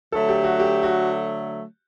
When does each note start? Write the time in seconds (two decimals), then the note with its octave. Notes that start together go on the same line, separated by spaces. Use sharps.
0.12 D3 F#3 A3 A4
0.28 G4
0.44 F#4
0.60 G4
0.83 F#4